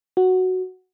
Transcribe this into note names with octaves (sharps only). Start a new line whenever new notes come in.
F#4